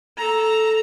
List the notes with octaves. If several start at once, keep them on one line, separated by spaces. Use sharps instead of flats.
A4 A#5